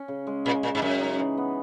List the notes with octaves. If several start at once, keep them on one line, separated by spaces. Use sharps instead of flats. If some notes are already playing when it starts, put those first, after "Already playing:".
Already playing: C#4
C#3
G#3
A#2 C#3
A#2 C#4
G#2
F#2 C#3
D#4
E3
B3